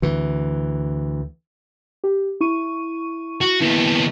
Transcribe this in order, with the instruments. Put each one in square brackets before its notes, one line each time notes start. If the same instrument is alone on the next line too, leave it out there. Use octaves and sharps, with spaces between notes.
[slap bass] D2 E3
[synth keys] G4
E4 C#6 D#7
[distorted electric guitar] F#4
[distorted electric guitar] D#2 B3 [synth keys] E4